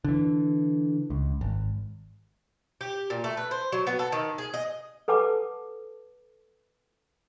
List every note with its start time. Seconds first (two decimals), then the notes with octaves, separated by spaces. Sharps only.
0.04 D3 E3
1.10 C#2
1.41 G#1
2.81 G4
3.10 A#2
3.24 A3
3.37 B4
3.51 C5
3.72 F#3
3.87 B3
3.99 A4
4.12 D#3
4.38 G#4
4.54 D#5
5.08 A4 B4 F#5 A5 D6